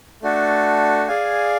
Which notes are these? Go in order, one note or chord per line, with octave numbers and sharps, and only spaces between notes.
A3 D4 F#4 A4
G#4 D5 F5 G#5